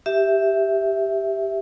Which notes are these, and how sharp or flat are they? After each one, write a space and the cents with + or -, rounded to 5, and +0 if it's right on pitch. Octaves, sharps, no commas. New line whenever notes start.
G4 +0 E5 +0